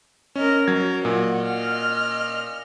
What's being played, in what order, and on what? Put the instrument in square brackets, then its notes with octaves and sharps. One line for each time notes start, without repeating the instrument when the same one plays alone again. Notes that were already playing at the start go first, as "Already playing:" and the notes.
[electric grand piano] C#4 [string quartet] A#4 D#5 F6
[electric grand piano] F#3 G#6 [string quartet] C#4 A#4
[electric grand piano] A#2 [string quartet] F#4 D#5
[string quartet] D#5 F6